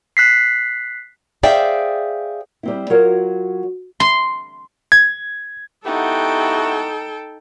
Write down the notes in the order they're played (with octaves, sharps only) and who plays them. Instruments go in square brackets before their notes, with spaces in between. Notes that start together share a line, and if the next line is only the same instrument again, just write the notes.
[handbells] F#6 B6 C7
[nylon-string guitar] G#4 C5 D5 E5 F5 G5
G3 C4 E4
F#3 F4 F#4 A#4 C#5
[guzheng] C6
[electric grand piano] G#6
[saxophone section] B3 E4 G4 [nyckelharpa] D#4 [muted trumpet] F#4 [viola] A4 G5